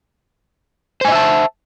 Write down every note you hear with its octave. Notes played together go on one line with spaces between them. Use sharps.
C5 D#5 E5 G#5 A5